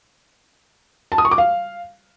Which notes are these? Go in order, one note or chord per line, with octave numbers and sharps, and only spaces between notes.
A5
D#6
C#6
D6
F5